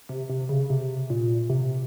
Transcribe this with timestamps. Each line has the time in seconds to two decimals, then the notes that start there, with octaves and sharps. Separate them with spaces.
0.09 C3
0.29 C3
0.49 C#3
0.70 C3
1.10 A#2
1.50 C3